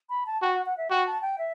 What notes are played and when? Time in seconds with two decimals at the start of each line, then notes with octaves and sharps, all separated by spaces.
0.09 B5
0.26 A5
0.42 F#4 G5
0.54 F#5
0.66 F#5
0.77 E5
0.90 F#4 G5
1.06 A5
1.22 G5
1.38 E5